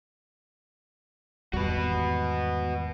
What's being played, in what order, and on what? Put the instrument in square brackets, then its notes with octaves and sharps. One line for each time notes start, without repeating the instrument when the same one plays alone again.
[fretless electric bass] G#1 E2 G3 [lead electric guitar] F#4 B4